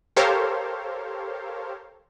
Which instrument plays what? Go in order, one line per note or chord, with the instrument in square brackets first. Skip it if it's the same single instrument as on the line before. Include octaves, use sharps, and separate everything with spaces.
[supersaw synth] G4 A4 A#4 C5 C#5 F5